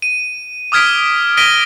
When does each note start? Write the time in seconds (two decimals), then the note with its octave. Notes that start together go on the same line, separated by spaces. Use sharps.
0.02 D#7
0.72 D6 D#6 F6 G#6 B6 D7
1.37 D#6 A#6 B6 D7 D#7 G7